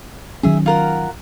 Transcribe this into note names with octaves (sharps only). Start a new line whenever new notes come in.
D#3 F#3 C#4 G#4 E5
F4 A#4 F#5